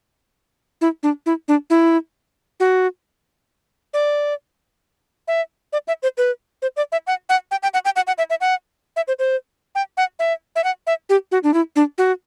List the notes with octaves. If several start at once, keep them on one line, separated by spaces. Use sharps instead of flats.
E4
D4
E4
D4
E4
F#4
D5
E5
D5
E5
C5
B4
C5
D5
E5
F#5
F#5
G5
G5
F#5
G5
F#5
F#5
E5
E5
F#5
E5
C5
C5
G5
F#5
E5
E5
F#5
E5
G4
F#4
D4
E4
D4
F#4